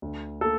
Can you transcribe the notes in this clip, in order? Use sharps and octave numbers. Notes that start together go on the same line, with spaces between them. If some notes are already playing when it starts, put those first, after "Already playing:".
D2
A#3 A4